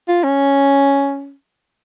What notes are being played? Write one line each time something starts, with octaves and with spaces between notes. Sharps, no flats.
F4
C#4